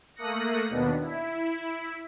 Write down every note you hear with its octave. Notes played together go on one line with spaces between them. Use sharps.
A3 A#3 D#6 F#6 A#6 C#7
D#2 B2 D#3 B3 D4
E4